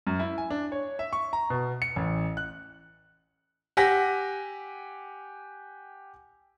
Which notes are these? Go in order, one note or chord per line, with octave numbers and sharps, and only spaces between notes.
F#2
E4
G#5
D4
C#5
E5
C#6
A#5
B2
C#7
A1
F#6
G4 F#5 G#5 A#6 B6